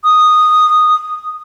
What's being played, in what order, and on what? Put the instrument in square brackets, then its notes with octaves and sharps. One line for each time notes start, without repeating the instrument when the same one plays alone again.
[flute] D#6